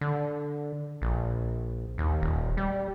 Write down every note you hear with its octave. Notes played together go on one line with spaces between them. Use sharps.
D3
A#1
D#2
D#1
G3